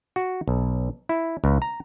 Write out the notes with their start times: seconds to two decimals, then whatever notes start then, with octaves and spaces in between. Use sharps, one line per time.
0.16 F#4
0.48 B1
1.09 E4
1.44 C#2
1.62 A#5